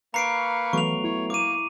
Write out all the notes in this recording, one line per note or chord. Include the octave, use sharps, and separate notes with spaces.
A#3 B4 F5 A#5 C#6 C7 D7
E3 F#3 A3 B3 C#6 F7
E4 C#5
A#3 D6 D#7